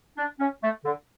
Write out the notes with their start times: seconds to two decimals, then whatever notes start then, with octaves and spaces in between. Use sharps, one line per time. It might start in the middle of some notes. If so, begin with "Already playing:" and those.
0.17 D4
0.40 C#4
0.63 A3
0.85 D3